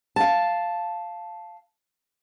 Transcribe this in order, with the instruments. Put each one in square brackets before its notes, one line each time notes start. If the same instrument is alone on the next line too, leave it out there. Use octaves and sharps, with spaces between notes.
[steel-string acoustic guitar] F5 A5